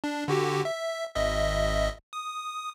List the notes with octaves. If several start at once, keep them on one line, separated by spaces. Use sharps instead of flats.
D4
D3 F#4 G4
E5
G#1 D#5 E5
D#6